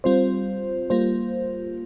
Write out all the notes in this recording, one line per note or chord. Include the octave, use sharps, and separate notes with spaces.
G3 C4 F4 C5
G3 A#3 F4 C5